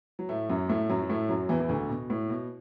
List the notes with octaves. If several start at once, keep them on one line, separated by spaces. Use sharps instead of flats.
F#3
A2 A3
F#2 F#3
A2 A3
F#2 F#3
F#3
A2 A3
F#2 F#3
E2 E3
E3
D2 D3
B2
A2
B2